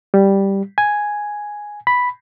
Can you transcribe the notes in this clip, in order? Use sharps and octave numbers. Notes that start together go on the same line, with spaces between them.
G3
G#5
B5